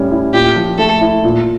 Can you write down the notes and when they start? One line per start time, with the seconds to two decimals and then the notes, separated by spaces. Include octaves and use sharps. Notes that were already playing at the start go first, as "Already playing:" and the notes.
Already playing: A2 G3 C#4
0.11 E4
0.33 A#2 G4
0.56 F3
0.78 A3 A4
1.01 E4
1.24 A#2